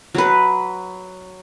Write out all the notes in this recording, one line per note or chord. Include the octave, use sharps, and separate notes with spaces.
F#3 B4